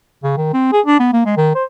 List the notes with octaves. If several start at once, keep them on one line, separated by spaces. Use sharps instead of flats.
C#3
D#3
C4
G#4
D4
B3
A#3
G#3
D#3
C5